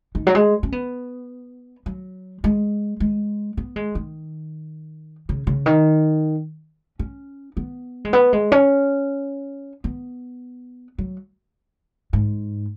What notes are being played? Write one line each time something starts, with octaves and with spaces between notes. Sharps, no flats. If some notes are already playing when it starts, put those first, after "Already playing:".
D#3
F#3
G#3
C#4
B3
F#3
G#3
G#3
B3
G#3
D#3
C#3
C#3
D#3
C#4
B3
G#3
B3
G#3
C#4
B3
F#3
G#2